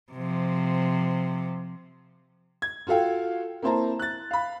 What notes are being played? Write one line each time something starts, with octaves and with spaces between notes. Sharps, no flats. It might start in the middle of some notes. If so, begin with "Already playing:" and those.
C3 F3
G#6
F4 F#4 A4 F5 G5
A#3 C4 E4 C5 A5 A#5
F#6 A6
F5 B5